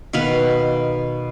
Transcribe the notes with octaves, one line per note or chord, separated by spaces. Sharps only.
B2 D#3 B4 F5